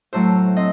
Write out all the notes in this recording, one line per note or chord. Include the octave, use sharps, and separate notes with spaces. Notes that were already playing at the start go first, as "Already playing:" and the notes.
A2 F#3 A3 C5
C4 D#5